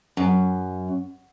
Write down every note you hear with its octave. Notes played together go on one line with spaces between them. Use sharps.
F#2